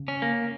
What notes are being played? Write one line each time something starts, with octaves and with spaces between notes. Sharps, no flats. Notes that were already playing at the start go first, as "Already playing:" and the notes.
Already playing: C#3
C#4
A#3